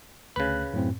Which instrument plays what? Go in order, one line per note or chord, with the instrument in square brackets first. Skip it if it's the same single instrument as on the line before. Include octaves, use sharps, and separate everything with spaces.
[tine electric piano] D2 F#6 [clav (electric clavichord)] C#3 B4
[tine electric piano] F#2 A2 C4